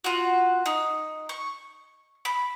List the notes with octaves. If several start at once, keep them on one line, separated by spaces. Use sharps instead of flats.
F4 F#4
D#4
C#6
B5